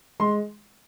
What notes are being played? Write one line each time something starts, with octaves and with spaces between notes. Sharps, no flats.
G#3 C6